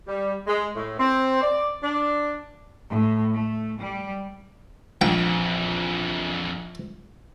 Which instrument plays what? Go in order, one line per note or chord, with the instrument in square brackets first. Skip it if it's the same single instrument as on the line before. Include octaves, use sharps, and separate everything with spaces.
[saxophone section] G3
G#3
A2
C4
D5
D4
[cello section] A2
A3
G3
[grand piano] A#1 [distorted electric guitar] F2 E3 [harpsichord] G5